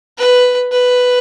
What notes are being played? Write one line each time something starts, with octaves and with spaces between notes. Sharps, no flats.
B4
B4